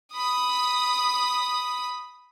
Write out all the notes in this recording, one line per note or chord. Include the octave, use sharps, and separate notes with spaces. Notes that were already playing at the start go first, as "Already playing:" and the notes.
B5 D#6